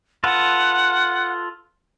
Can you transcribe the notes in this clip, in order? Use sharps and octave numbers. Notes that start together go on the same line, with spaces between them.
F4 A4 B4 F#5